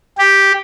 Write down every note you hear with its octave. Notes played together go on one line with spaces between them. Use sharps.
G4